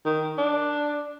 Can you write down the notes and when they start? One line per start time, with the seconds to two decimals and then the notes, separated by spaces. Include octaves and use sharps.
0.06 D#3
0.38 D4